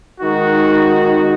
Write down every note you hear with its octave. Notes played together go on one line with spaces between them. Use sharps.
D#3 G#3 D#4 F#4